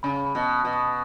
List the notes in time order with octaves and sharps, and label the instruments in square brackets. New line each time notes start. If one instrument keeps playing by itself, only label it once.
[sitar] C#3 [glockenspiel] B5
[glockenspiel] B5
[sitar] B2
[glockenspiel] B5
[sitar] B2
[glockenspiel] D#6